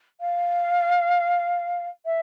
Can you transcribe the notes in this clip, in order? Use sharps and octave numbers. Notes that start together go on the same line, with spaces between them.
F5
E5